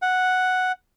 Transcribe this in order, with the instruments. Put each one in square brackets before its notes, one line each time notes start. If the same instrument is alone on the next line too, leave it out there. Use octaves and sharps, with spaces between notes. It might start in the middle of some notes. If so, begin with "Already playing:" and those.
[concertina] F#5